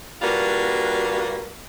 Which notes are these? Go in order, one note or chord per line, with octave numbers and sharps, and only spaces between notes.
G3 A#3 D4 F4 F#4 B4